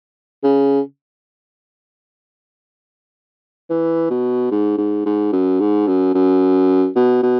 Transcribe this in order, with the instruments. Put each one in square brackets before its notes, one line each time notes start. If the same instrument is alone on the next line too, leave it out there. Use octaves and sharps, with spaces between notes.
[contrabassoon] C#3
E3
B2
G#2
G#2
G#2
F#2
G#2
F#2
F#2
B2
B2